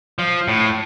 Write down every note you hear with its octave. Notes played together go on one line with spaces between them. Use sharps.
F3
A2